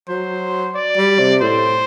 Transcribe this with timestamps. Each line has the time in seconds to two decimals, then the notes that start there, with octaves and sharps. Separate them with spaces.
0.09 F#3 C5
0.75 D5
0.97 G3
1.19 C3
1.41 A2 C5